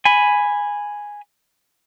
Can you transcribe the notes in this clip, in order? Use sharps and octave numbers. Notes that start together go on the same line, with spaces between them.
G#5 B5